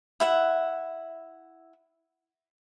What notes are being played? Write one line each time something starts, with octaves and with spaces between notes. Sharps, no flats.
E4 E5 F#5